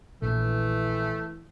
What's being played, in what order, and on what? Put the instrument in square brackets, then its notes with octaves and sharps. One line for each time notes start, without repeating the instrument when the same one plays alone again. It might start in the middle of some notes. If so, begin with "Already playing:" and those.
[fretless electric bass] A#1 [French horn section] E3 [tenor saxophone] A3